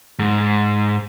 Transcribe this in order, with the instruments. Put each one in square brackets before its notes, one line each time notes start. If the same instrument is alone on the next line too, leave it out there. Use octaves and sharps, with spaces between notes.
[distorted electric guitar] G#2